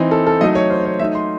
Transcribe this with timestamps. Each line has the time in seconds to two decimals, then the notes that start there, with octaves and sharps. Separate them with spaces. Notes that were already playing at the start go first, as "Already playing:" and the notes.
Already playing: E3 C4 D#4
0.11 A4
0.27 A4
0.41 F#3 A3 D#4 D#5
0.55 C#5
0.70 C5
0.85 C#5
0.99 F#3 A3 D#4 E5
1.15 C6